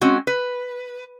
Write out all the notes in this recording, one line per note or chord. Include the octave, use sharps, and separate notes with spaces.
G#3 C4 C#4 F#4
B4